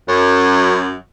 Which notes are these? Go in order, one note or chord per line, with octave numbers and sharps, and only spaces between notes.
F#2